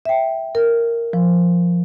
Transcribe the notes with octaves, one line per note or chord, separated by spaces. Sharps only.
E5 G5
A#4
F3